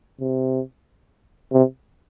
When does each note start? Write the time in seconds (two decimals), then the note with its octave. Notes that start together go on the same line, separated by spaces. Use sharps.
0.20 C3
1.53 C3